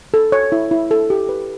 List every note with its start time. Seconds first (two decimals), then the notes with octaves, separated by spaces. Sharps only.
0.14 A4
0.32 C#5
0.52 E4
0.71 E4
0.91 A4
1.10 G4
1.29 B4